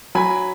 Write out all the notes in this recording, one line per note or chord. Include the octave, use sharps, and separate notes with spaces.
F#3 G#5 B5